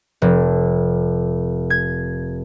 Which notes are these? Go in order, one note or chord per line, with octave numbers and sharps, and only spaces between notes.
F1
G#6